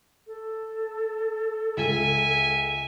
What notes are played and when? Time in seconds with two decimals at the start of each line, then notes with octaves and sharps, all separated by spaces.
0.27 A4
1.77 C#2 E5 G#5